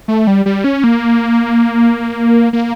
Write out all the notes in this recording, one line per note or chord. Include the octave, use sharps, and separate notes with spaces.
A3
G3
G3
C#4
A#3
A#3